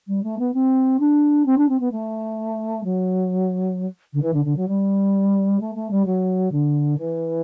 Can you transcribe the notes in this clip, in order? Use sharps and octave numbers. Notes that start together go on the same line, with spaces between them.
G3
A3
B3
C4
D4
C4
D4
C4
B3
A3
F#3
D3
E3
D3
D3
F#3
G3
A3
A3
G3
F#3
D3
E3